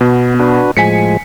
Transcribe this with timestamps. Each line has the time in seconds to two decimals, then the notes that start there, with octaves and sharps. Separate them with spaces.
0.01 B2 B3
0.39 D4 F#4 B4
0.77 A2 F3 G#3 G#5 B6 C#7